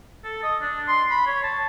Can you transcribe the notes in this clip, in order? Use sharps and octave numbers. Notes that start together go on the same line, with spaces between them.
A4
D#5
D4
C6
B5
C#5
A5